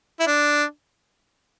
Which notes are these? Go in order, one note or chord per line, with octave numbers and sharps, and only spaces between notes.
E4
D4